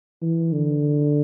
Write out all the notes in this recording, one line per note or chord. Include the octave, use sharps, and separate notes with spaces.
E3
D3